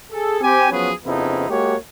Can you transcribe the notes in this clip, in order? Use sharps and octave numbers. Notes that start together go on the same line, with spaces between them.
G#4 A4
C4 G4 G#5
F3 F#3 B3 C#4 G#4 B4
F2 C#3 F3 B3 D#4 E4
G#3 A#3 F#4 G4 C#5